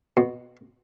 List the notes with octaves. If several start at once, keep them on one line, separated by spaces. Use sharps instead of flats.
B2